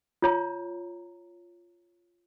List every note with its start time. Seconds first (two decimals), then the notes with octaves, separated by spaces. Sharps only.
0.22 F4 C#5 A#5